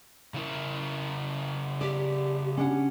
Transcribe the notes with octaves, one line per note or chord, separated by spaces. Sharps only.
C#3 E4 A#4
G4 D5
C#4 D4 F#5